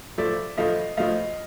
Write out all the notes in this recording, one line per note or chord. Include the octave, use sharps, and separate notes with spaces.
A2 F3 A3 D5 E5
A2 F3 A3 D#5 F5
A2 F3 A3 D#5 F5